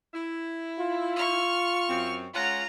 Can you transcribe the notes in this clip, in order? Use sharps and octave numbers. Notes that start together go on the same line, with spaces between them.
E4
F4
C#6 F6
F#2 C4
G#3 C#4 F4 F#5 A#5